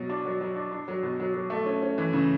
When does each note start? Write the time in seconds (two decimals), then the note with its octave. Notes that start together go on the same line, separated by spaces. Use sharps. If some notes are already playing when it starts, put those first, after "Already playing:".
Already playing: B2 F#3
0.10 D4
0.25 F#3
0.41 F#3
0.56 D4
0.72 D4
0.88 F#3
1.03 B2
1.20 F#3
1.34 F#3
1.50 A3
1.66 C#4
1.82 C#4
1.98 E3
2.13 C#3